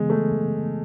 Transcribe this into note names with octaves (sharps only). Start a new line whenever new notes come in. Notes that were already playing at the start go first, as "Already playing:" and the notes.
Already playing: C#3 E3 G#3 B3
A3